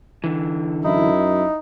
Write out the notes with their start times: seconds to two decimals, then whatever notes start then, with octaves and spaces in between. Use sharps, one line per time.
0.24 D3 E3
0.85 F#2 D#4 E4